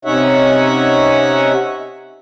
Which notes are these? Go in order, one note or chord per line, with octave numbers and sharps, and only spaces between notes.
C3 C#4 D#4 C#5 E5 F#5